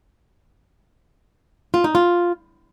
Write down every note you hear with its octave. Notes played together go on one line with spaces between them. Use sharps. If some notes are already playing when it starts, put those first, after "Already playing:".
F4
D#4
F4